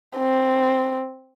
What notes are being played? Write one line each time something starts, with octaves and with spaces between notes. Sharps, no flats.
C4